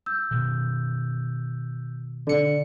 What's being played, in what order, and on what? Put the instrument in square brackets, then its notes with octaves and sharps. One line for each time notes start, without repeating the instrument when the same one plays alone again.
[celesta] E6 G6
[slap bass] B2 D#3
[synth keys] D3 C#7 [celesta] D5